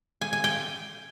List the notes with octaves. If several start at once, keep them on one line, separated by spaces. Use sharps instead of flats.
G#5
G#5
G5